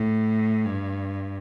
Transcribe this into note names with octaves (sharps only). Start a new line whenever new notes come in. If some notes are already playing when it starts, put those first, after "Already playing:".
Already playing: A2
G2